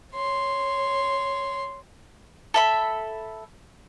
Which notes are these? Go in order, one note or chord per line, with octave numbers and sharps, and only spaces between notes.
C#5 C6
A4 E5 B5